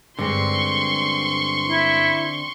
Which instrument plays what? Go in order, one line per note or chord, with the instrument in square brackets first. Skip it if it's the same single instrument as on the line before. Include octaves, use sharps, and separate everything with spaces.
[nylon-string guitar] G2 G#3 [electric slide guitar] D3 C4 [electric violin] C6 C#6
[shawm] E4